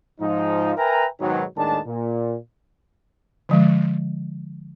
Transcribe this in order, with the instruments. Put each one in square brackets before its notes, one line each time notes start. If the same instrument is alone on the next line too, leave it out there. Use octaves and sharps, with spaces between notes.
[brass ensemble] G#2 F3 D#4
A#4 B4 E5 G5 G#5 A#5
G#2 B2 D#3 F#3
D#2 A2 D#3 G#3 D4 A5
A#2
[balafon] D3 F3 G#3